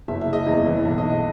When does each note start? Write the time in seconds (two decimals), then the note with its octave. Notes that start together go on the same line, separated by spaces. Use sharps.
0.08 F#1 E5
0.21 E5
0.27 C#3
0.33 D#5
0.47 E2
0.66 E3
0.85 B1 E5
0.98 D#5
1.03 B1
1.10 D#5